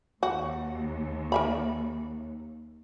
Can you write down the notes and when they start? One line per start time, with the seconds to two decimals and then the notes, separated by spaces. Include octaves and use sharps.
0.23 D#2 F#4
1.32 A#4 E5 B5